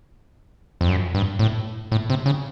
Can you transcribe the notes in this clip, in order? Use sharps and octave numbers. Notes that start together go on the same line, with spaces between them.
F2
F#2
G2
A2
A2
C3
C#3